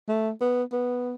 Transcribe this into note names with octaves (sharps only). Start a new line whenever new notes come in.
A3
B3
B3